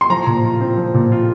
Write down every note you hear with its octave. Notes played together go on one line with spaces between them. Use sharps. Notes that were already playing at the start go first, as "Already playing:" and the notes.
C6
F3 A#5
A#2
F4
C4
F3
A#2
F4